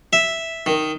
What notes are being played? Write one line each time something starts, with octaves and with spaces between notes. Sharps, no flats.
E5
D#3